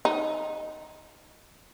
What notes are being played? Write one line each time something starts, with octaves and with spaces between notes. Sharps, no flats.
D#4